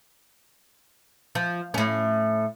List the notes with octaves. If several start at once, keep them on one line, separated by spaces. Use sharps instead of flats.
F3
A2 C#4